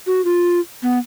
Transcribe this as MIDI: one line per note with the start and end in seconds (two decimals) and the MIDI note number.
0.07 0.24 66
0.25 0.60 65
0.83 0.98 59